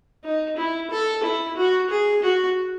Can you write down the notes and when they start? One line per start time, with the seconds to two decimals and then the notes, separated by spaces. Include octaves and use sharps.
0.24 D#4
0.56 E4
0.90 A4
1.23 E4
1.56 F#4
1.90 G#4
2.22 F#4